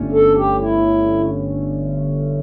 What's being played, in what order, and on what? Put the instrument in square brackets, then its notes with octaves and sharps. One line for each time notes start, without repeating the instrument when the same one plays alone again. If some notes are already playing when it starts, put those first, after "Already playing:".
Already playing: [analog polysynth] G1 G2 D3 A3 C#4
[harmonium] A4
G4
E4